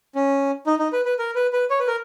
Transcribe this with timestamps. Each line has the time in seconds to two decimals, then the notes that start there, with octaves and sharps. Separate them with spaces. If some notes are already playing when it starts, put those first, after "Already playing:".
0.15 C#4
0.67 D#4
0.79 D#4
0.93 B4
1.05 B4
1.19 A#4
1.35 B4
1.53 B4
1.70 C#5
1.79 B4
1.87 A#4